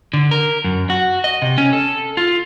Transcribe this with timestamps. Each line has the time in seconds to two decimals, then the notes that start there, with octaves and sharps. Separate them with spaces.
0.13 D3
0.31 A#4
0.64 F#2
0.90 F#4
1.24 D#5
1.42 C3
1.58 C#4
1.73 A4
2.17 F4